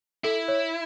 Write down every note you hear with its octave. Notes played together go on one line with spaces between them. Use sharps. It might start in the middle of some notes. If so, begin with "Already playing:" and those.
E4 A4
C#5